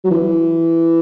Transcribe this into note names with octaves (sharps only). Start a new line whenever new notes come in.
F#3
E3